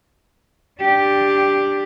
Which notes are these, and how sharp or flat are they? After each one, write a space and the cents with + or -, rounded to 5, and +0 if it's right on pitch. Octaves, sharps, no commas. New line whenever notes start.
D4 +0 G4 +0